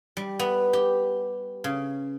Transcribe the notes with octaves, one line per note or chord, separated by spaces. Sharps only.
G3
B3
G4
C#3